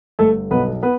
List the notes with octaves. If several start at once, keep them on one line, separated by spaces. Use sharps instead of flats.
G1 A3 A4
B1 B3 B4
B3 B4